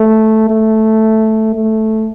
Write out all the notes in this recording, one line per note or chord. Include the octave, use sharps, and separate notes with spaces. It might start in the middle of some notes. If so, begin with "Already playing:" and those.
Already playing: A3
A3
A3